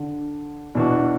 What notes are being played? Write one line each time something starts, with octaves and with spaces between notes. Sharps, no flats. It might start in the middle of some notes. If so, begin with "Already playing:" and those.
Already playing: D3
E2 B2 E3 D4 F#4